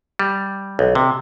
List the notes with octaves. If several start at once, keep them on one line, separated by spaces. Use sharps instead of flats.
G3
B1
C3